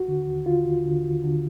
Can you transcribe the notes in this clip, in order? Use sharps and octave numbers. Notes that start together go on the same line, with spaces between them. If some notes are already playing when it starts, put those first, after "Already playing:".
Already playing: D#2 F#4
D3
D#2
D3 F4
D#2
D3
D#2
D3